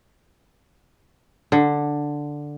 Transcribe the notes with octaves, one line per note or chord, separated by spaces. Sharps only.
D3